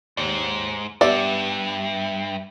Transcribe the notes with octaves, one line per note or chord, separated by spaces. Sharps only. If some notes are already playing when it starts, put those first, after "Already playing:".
D#2 G#2 D5
G2 B3 G4 D5 E5 F#5